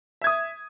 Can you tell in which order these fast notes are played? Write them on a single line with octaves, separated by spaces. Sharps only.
E5 G#6 D#6